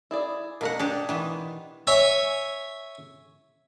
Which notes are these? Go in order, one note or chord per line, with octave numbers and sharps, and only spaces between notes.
E4 G#4 D5
B2 A#3 F#4 A#4 F#5
D4 G4 G#4
D#3 E3 B3
C#5 E5 G#5